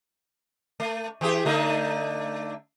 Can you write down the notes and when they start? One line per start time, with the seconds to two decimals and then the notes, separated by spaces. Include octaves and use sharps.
0.80 A3
1.21 E3 G4 G#4
1.45 D3 A3 D#4